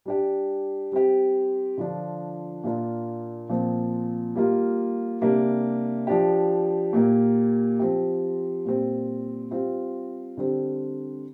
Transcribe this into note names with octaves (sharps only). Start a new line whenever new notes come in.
G3 D4 G4
G3 C4 G4
D3 F3 D4 F4
A#2 A#3 D4 F4
A#2 F3 C4
G3 A#3 F4
C3 G3 A#3 D4
F3 D4 G4
A#2 A#3 G4
F3 C4 G4
A#2 G3 C4
G3 C4 F4
D3 G3 C4